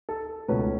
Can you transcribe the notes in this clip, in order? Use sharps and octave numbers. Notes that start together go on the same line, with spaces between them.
A4
C#2 B2 A3 C#4 B4